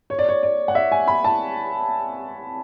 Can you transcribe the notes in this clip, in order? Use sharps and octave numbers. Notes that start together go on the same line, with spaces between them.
C#5
D5
C#5
D5
F#5
E5
G#5
B5
A5